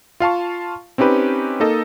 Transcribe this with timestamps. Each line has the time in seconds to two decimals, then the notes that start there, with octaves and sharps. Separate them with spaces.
0.20 F4 F5 A5 C#6
0.98 C4 C#4 D#4 G4 B4
1.60 A#3 D#4 A4 D#5